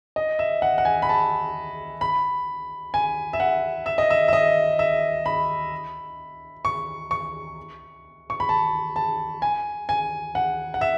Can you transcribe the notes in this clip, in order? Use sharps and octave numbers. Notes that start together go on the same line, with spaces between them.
D#5
E5
F#5
F#5
G#5
B5
A5
B5
G#5
E5
F#5
E5
D#5
E5
E5
D#5
E5
B5
C#6
C#6
C#6
B5
A5
A5
G#5
G#5
F#5
F#5
E5